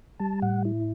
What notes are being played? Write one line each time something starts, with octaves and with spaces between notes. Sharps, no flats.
G3 A5
A2 F#5
E4